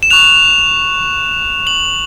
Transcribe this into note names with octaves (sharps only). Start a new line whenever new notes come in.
E7
C#6 F#6 F7
F#7